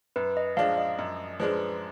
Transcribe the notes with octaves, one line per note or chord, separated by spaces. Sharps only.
F#2 B4
D#5
F3 G#3 D4 F5
D#5
F#2 D#5
F3 G#3 D4 B4